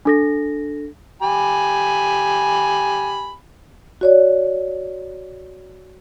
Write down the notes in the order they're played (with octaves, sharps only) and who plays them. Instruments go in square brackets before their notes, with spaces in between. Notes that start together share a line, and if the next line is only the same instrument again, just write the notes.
[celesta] D4 A4 A#6
[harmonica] G4 G#5 B5
[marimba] F#4 C#5 D5